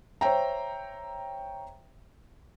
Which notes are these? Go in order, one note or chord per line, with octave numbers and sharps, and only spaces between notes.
C5 C#5 E5 G5 A#5